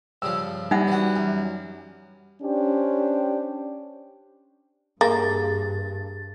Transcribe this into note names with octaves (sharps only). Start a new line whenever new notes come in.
G2 C#3 F3 E6
G3 D#4 E5 F#5
E3 F#4
F#2
C#4 D4 G4 C5
G2 A#3 G#4 A6